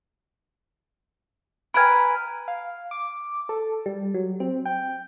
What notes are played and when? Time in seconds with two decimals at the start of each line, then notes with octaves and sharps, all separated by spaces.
1.74 A#4 B4 G#5 B5 F6
2.48 F5
2.91 D6
3.49 A4
3.86 G3
4.14 F#3
4.40 C4
4.66 G5